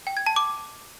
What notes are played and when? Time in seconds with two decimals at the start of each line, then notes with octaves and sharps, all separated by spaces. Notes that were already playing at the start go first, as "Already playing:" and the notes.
0.07 G5
0.17 G#6
0.26 A5
0.36 D6